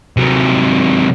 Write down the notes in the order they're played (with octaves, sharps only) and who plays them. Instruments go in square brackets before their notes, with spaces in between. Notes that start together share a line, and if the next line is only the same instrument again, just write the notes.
[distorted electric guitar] C3 F#3